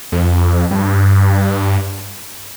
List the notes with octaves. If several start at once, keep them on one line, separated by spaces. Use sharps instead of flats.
F2
G2